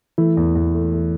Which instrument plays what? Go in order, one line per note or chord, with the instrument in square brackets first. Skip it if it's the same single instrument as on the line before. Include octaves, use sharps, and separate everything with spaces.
[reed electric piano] E3 E4 [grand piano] A3
[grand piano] E2
E2
A3
A3